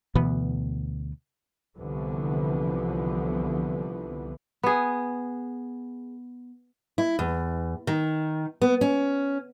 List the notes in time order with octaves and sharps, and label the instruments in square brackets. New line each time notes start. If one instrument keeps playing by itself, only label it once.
[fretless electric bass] D2 B2 E3 B3
[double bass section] C2 D3 E3 F3 B3
[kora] B3 G#4
[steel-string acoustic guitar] E4
E2
D#3
B3
C#4